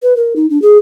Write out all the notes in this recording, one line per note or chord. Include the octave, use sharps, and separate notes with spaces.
B4
A#4
D#4
D4
G#4